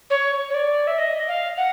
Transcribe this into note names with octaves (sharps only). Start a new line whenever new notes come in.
C#5
C#5
D5
E5
D#5
F5
F#5